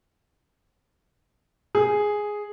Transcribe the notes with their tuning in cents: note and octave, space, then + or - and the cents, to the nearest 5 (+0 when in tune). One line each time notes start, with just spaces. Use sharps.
G#4 +0